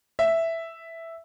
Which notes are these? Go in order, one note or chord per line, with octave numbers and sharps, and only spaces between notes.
E5